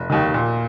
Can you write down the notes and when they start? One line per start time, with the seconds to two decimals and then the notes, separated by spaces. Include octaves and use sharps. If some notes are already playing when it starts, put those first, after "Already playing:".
Already playing: F1
0.10 D#2 D#3
0.34 A#2